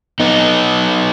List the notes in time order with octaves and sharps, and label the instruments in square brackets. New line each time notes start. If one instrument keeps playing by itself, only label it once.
[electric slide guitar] B3 D#4